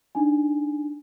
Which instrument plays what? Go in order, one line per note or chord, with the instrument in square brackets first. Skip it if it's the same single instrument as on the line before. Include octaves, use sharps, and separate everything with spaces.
[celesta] D4 D#4 G#5